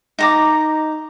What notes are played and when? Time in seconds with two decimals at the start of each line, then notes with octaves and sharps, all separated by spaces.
0.19 D#4 A#5 D6